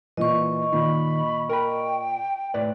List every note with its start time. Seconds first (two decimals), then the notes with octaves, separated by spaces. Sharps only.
0.17 A#2 E3 D#5 C#6
0.73 A#2 D#3 B5
1.49 A#4 G5 B5
2.54 A2 B4 D5